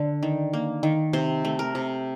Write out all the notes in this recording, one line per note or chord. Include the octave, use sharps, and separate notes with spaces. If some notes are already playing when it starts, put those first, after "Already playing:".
Already playing: D3
D#3
A#3
D#3
C3 C5
A3
A#4
C3